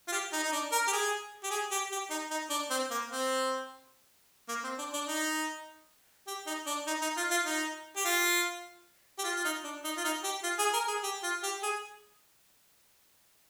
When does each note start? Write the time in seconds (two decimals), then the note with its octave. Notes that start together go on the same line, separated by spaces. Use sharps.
0.08 F4
0.12 G4
0.33 D#4
0.43 D#4
0.52 D4
0.72 A#4
0.87 G4
0.92 G#4
1.44 G4
1.51 G#4
1.71 G4
1.92 G4
2.10 D#4
2.31 D#4
2.50 D4
2.70 C4
2.91 A#3
3.11 C4
4.48 A#3
4.64 C4
4.79 D4
4.93 D4
5.08 D#4
6.27 G4
6.47 D#4
6.67 D4
6.87 D#4
7.01 D#4
7.17 F4
7.31 F4
7.46 D#4
7.96 G4
8.05 F4
9.19 G4
9.24 F4
9.36 F4
9.45 D#4
9.64 D4
9.84 D#4
9.97 F4
10.04 D#4
10.24 G4
10.43 F4
10.59 G#4
10.73 A#4
10.88 G#4
11.03 G4
11.23 F4
11.43 G4
11.63 G#4